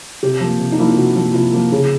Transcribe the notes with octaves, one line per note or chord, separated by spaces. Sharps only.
C3 G4
F3 A#3
C3
D#4
F3 A#3 E4
F4
C3 F#4
F3 A#3
C3 F4
F3 A#3
C#3